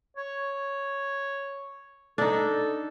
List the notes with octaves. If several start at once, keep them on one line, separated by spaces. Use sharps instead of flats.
C#5
D4 D#4 A4